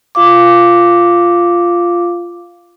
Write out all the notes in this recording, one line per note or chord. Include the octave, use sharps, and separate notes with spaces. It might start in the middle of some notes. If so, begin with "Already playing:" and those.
F4 F5 D6